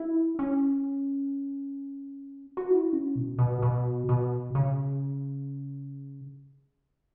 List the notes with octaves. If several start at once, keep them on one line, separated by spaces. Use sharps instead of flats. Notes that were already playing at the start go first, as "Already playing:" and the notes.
Already playing: E4
C#4
F#4
E4
C#4
B2
B2
B2
B2
C#3